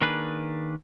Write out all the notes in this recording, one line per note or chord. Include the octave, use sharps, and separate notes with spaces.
D#3 A#3 D4 G#4 B4